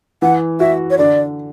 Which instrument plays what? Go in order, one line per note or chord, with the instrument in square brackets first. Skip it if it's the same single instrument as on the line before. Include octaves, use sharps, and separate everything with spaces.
[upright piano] E3 [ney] F#5
[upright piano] F#4 [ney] E5
[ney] C#5
[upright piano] D3 [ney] D5